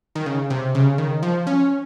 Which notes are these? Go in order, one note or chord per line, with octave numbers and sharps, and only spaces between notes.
D#3
C#3
C3
C#3
D#3
F3
C#4